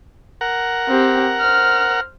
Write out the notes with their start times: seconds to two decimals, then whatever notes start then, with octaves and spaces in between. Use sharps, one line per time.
0.41 A#4 F#5
0.89 C4 G4
1.39 C5 F6